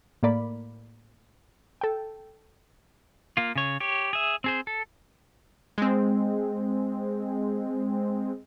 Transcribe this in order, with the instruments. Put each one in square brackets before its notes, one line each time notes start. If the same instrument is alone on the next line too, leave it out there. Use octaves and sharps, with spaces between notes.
[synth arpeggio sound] A2 A#3 D5 B5
A4 G5
[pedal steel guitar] A#3 F4
C#3 C#5
G4 C#5
G#4 E5
C4 G#4 C5
A4
[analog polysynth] G#3 C4